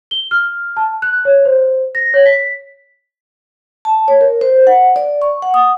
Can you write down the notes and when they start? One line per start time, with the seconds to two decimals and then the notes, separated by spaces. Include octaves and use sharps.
0.11 G7
0.31 F6
0.77 A5
1.02 F#6
1.25 C#5
1.45 C5
1.95 A#6
2.14 C#5
2.26 B6
3.85 A5
4.08 C#5
4.21 A#4
4.41 C5
4.67 F#5
4.96 D5
5.22 C#6
5.42 F#5
5.54 D#6